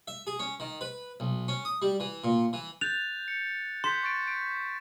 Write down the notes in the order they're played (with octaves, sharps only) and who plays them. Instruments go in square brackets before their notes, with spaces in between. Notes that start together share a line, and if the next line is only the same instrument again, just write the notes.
[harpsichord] E5
G#4
C#4
D#3
B4
B1
C#4
D#6
G3
E3
A#2
E3
[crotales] F#6 G6 A6 [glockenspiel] F7
[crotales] C#7
[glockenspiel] C6 [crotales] G6 B6 E7
[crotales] C#6 A6 D7
D7